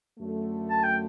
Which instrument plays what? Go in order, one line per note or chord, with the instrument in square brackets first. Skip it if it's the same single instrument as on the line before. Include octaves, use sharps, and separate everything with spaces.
[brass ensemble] F#2 D3 A3
[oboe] A5
G5